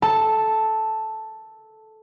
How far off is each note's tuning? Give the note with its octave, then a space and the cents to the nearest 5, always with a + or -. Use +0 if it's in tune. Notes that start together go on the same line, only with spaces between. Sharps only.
A4 -15 A5 +0